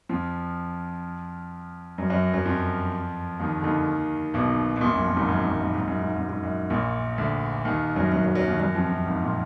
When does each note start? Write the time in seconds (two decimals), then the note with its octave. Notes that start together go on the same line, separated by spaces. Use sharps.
0.09 F2 F3
1.98 F#2 F#3
2.10 F#2 F#3
2.33 F#2 F#3
2.45 F2 F3
3.40 D#2 D#3
3.60 D3
3.64 D#2 D#3
4.34 B1 B2
4.76 B2
4.81 A#1 A#2
4.94 F#2
5.05 F2
5.16 G#1 G#2
5.28 F#2
5.44 F#2
5.60 F#2
5.74 G#2
5.87 F#2
6.02 G#2
6.16 F#2
6.29 G#2
6.43 F#2
6.70 A#1 A#2
7.18 D2 D3
7.65 D#2 D#3
7.96 F#2 F#3
8.12 F#2 F#3
8.24 F#2 F#3
8.35 F#2 F#3
8.47 D#2 D#3
8.59 F#2 F#3
8.75 F2 F3
8.90 F#2
9.06 G#1 G#2
9.22 A#2